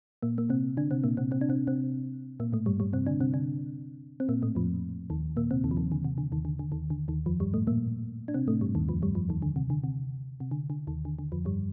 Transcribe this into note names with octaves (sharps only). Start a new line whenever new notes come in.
A#2 A#3
A#3
C3 C4
D3 D4
C3 C4
A#2 A#3
C3 C4
C3 C4
D4
C3 C4
C3 C4
A#2 A#3
A2 A3
G2 G3
G2 G3
C3 C4
D3 D4
C3 C4
D3 D4
C4
A#2 A#3
A2 A3
F2 F3
D#2 D#3
A#2 A#3
C3 C4
D#2 D#3
F3
D#2 D#3
D3
C3
D3
D#2 D#3
D3
D3
D#2 D#3
D3
D#2 D#3
F2 F3
G2 G3
A2 A3
A#2 A#3
D4
C3 C4
A2 A3
G2 G3
D#2 D#3
F2 F3
G2 G3
F2 F3
D#2 D#3
D3
C3
D3
C3
C3
D3
D3
D#2 D#3
D3
D3
F2 F3
G2 G3